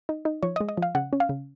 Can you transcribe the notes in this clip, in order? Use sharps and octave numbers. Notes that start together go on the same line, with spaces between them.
D#4
D#4
F3 C#5
D#5
G#3
D#5
F3 F5
C#3 F#5
C#4
F5
C#3